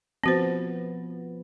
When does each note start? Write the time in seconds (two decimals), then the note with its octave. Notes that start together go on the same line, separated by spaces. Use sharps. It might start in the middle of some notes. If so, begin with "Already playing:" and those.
0.24 F3 B3 C4 F#4 C5